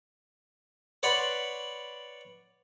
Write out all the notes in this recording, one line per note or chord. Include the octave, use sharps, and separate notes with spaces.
B4 C#5 D5 F#5 B5 C6